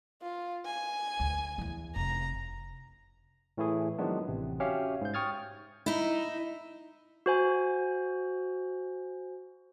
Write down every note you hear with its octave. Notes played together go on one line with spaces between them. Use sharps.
F4
G#5
D2
E2 E3
F1 A#5
A2 E3 A3 E4 G#4
D#3 F3 F#3 G#3 B3 D4
A1 C3
C#4 F#4 G4 C#5 E5 F5
G#2 G6
G5 C#6 D#6 F6 G#6 A6
D#4 E4
F#4 C5 G#5